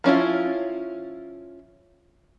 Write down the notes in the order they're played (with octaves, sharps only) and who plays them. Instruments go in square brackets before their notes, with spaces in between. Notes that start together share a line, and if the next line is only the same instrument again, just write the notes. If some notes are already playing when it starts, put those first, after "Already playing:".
[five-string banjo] F3 C#4 E4 F4